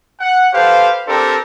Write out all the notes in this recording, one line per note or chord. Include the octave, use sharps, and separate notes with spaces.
F#5
G4 A4 B4 C5 F5
C4 D4 G4 A4 A#4 C5